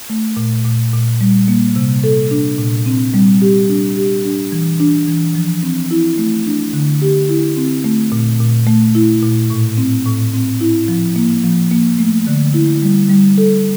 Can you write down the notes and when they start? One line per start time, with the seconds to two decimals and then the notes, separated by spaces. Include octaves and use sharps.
0.10 A3
0.37 A#2
0.65 A#2
0.93 A#2
1.21 G3
1.48 A#3
1.76 C3
2.04 A4
2.31 D4
2.59 A#2
2.86 C4
3.14 G3
3.42 G4
3.69 D4
3.97 G4
4.25 D4
4.52 E3
4.80 D4
5.07 E3
5.35 F3
5.63 C4
5.91 E4
6.18 A3
6.46 D4
6.73 D3
7.02 G4
7.29 E4
7.57 C4
7.84 A3
8.12 A#2
8.40 A#2
8.67 A3
8.95 E4
9.22 A#2
9.50 A2
9.77 C4
10.06 A2
10.34 C4
10.61 E4
10.88 F3
11.16 A#3
11.44 F3
11.72 A#3
11.99 A3
12.27 D3
12.54 E4
12.82 G3
13.10 G3
13.38 A4